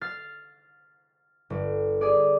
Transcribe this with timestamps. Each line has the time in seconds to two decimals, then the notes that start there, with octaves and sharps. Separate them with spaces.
0.01 F6 A6 C7
1.50 G1
2.01 G#4 D5